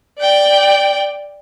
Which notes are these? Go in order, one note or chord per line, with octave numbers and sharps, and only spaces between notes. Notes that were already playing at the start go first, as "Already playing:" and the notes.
D5 G5